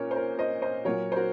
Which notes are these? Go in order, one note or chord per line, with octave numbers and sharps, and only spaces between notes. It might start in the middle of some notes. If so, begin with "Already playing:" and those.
Already playing: A#2 C#4 A#4 C#5
C5
A#4 C#5
C5 D#5
C5 D#5
A#2 F#3 A#4 C#5
C5
F#4 A#4